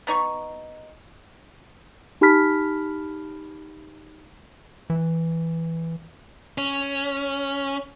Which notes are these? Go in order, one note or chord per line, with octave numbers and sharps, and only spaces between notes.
B3 D#4 C#5 C#6
D#4 G4 A5 B5 F6 B6
E3
C#4